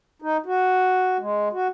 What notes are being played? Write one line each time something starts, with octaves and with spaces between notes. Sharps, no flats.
D#4
F#4
G#3
F#4